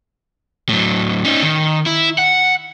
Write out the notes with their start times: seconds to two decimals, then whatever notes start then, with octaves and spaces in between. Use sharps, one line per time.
0.69 A2 F#3
1.25 C#4 D#4
1.43 D#3
1.86 E4
2.18 F#5